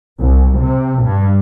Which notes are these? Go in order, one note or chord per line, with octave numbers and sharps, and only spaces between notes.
C2
C3
G2